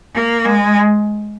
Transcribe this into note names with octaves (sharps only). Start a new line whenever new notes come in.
A#3
G#3